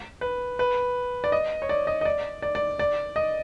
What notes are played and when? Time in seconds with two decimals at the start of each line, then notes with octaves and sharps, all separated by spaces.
0.21 B4
0.59 B4
1.24 D5
1.32 D#5
1.62 C#5
1.69 D5
1.87 D#5
2.01 D#5
2.05 D5
2.42 D5
2.55 D5
2.79 D5
3.16 D#5